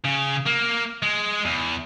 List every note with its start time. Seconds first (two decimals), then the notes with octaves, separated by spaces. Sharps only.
0.04 C#3
0.47 A#3
1.02 G#3
1.45 E2